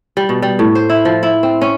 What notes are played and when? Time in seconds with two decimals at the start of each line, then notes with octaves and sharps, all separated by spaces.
0.17 G3
0.29 B2
0.42 G3
0.59 A2
0.75 C5
0.90 E4
1.05 F3
1.23 E4
1.43 C4
1.61 C#4